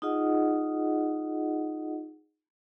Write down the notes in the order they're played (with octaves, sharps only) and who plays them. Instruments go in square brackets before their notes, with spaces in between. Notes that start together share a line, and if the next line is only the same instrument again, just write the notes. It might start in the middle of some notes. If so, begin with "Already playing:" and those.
[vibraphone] D#4 F4 G#4 D#5 F#5